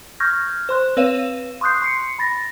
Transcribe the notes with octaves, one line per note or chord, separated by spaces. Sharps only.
C#6 F6 G6 G#6 A#6
C5 C6 F#6
C4 B4 C#5 F5 D#7 E7
C6 C#6 D#6 F#6 G6 C7
C6 C7 C#7
B5 A6 A#6